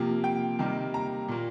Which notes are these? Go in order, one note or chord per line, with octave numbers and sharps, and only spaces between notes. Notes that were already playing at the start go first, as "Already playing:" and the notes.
Already playing: C3 F3 A#3
G5
C3 D#3 G3 A#3
A#5
A#2 A#3